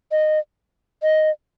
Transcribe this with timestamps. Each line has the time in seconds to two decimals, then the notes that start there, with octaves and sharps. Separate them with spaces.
0.12 D#5
1.03 D#5